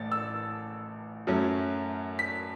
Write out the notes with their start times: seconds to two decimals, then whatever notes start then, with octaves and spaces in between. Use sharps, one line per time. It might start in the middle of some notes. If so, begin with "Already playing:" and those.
Already playing: A1 A2 A3 A6
0.12 E6
1.27 F#2 F#3 A3 C#4
2.19 B6